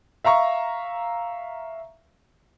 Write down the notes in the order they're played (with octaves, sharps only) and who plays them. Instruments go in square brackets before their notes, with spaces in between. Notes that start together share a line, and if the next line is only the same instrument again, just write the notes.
[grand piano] E5 F5 A#5 C#6